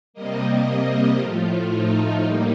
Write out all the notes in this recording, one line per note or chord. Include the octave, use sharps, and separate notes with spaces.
C3 G3 A#3 D#5
D#5
A2 F3 A3 F4
D#4
A2 G3 A#3